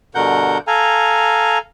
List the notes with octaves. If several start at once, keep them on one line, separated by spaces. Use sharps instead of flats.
G2 B2 D3 A#4 F#5 G6
A4 F5 G#5 A#5